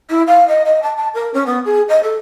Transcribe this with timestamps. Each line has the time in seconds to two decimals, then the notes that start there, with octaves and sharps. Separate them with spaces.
0.09 E4
0.27 F5
0.47 D#5
0.65 D#5
0.82 A5
0.96 A5
1.14 A#4
1.33 C#4
1.46 B3
1.65 G#4
1.88 D#5
2.02 A4